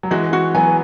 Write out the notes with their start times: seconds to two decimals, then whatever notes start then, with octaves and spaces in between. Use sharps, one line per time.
0.03 F#3
0.11 E3 G#3 F#4
0.33 F#4
0.55 F#3 B3 G#5